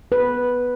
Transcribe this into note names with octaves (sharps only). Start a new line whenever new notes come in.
B4